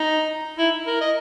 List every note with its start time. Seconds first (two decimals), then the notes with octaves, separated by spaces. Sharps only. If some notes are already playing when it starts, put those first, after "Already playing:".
Already playing: D#4
0.58 E4
0.87 A#4
1.01 D#5